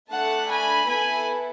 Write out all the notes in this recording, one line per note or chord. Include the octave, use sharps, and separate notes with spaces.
A3 D4 A4 F#5 A5
G#5 B5
B3 E4 A4 G#5 B5